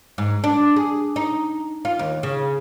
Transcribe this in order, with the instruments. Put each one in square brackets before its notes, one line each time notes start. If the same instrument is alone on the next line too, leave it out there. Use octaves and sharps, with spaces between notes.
[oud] G#2
D4
G#4
D#4
F4
D#2
C#3